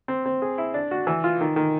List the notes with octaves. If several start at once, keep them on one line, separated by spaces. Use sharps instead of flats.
C4
C4
G#4
E4
D4
F#4
E3
F4
D#3
D#3